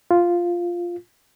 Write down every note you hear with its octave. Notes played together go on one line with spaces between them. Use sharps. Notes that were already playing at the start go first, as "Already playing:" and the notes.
F4